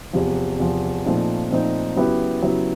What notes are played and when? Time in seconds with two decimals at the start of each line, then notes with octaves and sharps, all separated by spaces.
0.13 E2 C3 F3
0.59 E2 C3 F3
1.05 A#2 F3 A3 C4 D#4
1.51 A#2 F3 A3 C4 D#4
1.96 C#3 F#3 B3 E4 G4
2.42 C#3 F#3 B3 E4 G4